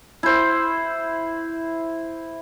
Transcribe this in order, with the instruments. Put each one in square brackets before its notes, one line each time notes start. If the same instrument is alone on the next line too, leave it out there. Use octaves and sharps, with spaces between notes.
[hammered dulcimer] E4 C5